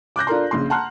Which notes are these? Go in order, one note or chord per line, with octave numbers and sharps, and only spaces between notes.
D6 F#6 G6 A#6
D4 F4 A4 A#4 A#5 C6
A#1 C#3 C6
F#5 A5 A#5 C6 F6 F#6